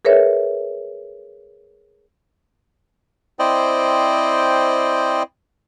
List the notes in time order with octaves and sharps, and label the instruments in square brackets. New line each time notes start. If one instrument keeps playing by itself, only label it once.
[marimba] G#4 A#4 B4 C#5 E5
[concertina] C4 E4 C5 D5 D#5 G5